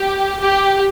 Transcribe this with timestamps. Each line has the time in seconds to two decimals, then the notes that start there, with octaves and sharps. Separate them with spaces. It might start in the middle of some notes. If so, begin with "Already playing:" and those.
Already playing: G4
0.39 G4